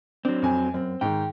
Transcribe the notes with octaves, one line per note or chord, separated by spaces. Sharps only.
F#3 C4 D4
F2 G#5
F#2 C4
G#2 D#3 G5